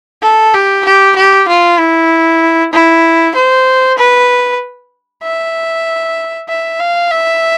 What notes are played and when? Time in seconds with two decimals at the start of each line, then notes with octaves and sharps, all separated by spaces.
0.22 A4
0.54 G4
0.85 G4
1.16 G4
1.48 F4
1.79 E4
2.73 E4
3.36 C5
3.98 B4
5.23 E5
6.49 E5
6.80 F5
7.11 E5